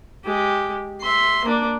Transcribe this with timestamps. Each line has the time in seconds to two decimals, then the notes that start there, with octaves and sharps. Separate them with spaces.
0.24 G#3 G4
1.01 E5 C6
1.45 A#3 D4